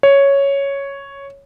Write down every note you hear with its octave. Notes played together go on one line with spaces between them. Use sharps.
C#5